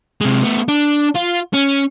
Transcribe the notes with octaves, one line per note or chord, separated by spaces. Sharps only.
C3 G#3
A3 B3
D4
F4
C#4